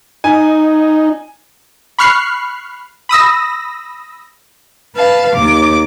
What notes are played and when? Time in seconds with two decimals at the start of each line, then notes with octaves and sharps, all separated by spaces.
0.24 D#4 G#5
1.99 B5 C#6 F6 F#6 C7
3.09 B5 D#6 E6 A#6
4.96 B4 F5 A5
5.35 D#2 D6